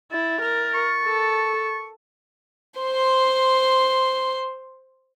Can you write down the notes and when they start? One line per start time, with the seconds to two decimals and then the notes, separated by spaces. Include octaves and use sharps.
0.12 E4 A6
0.41 A#4
0.74 C#6
1.04 A4
2.80 C5 C6